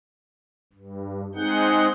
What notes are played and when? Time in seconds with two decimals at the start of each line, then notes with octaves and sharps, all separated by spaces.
0.73 G2
1.35 G#3 C4 D#4 G#4 F#5 G6